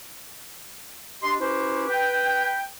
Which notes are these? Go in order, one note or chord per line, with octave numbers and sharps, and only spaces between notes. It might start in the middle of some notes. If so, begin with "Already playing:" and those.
D4 G4 D#5 C6
C#4 E4 F#4 G4 B4 C5
B4 G5